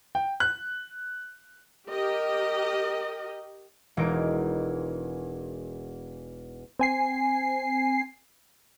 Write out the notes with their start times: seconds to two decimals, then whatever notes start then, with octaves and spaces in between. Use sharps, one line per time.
0.15 G5
0.40 F#6
1.89 G4 A#4 D#5
3.97 E1 E2 D#4 A#4 D7
6.79 C4 G#5 C7